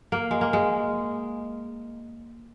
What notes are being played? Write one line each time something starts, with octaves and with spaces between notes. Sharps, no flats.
A#3
G#3
A#3
G#3